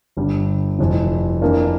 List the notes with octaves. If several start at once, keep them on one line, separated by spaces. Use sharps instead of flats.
G1 G2 D3 G3
F1 F2 E3
F2 E3 A#3 D4